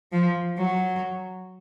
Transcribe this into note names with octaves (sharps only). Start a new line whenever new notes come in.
F3
F#3